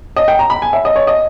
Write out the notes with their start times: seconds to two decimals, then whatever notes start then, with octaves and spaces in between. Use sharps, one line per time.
0.16 D#5
0.28 G5
0.39 A#5
0.50 B5
0.62 G#5
0.73 E5
0.85 D#5
0.96 C#5
1.07 D#5